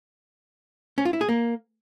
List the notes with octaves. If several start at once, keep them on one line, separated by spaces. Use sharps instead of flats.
C#4
F4
E4
G#4
A#3